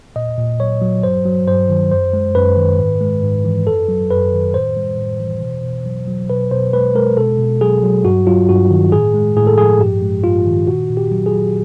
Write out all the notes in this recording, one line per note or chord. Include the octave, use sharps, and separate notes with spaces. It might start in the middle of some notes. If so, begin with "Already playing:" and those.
A#2 D#5
A#2
F#3 C#5
F#3
G2 C5
F#3
G2 C5
D#3
F#2 C5
G#3
F#2 B4
D#3
G#2
G#3
G#2
E3
F#2 A4
F#3
F#2 B4
D#3
A2 C5
G3
A2
E3
B2
B2
F#3
F#3
B2 B4
B2 C5
G#3 B4
G#3 A#4
B2 A4
B2
F#3 G#4
F#3
G2 F#4
F#3 F4
G2 F#4
D#3
A2 G#4
G#3
A2 G#4
A4
F3 G#4
G2 G4
G#3
G2 F4
D#3
A#2 F#4
A#2
G4
F#3
G#4
F#3